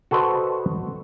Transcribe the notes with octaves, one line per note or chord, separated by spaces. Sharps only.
F#4 A4 B4 C5 D#5